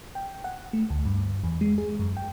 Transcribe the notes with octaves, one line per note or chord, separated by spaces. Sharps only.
G5
F#5
A3
D2
G2
E2
G#3
G#4
F#2
G5